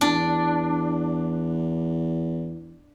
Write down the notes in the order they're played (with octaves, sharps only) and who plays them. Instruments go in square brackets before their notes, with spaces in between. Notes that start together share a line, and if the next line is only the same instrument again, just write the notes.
[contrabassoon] E2 [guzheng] D4